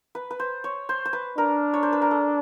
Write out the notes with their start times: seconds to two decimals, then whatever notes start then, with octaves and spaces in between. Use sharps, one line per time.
0.15 B4
0.31 B4
0.40 C5
0.64 C#5
0.89 C5
1.05 C5
1.13 B4
1.38 D4 A#4
1.74 C#5
1.83 C5
1.93 B4
2.02 A#4
2.11 A4